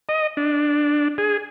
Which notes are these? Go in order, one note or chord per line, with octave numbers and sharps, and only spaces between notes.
D#5
D4
G#4